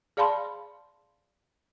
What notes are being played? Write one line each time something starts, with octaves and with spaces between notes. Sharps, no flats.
G#4 D5 F5 A5 B5 C6